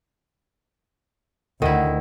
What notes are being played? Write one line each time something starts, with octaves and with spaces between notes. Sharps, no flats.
D2 D#3 E4 F#5